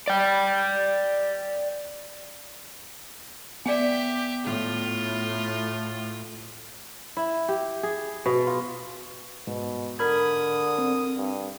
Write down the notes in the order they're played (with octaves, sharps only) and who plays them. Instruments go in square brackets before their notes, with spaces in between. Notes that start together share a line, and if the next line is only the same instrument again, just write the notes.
[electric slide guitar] D5 G5
[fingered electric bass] B3 [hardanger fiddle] G4 E5 [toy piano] D5 G5 G#5
[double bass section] A2 [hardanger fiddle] F4
[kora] E4
G4
G#4
B2
F4
[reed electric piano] G#2 [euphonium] B2
[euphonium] D3 [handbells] A#4 B5 G#6 [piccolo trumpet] D#6
[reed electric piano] C4
[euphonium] G2